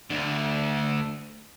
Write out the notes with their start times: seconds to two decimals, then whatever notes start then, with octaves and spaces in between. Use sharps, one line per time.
0.10 D2 D3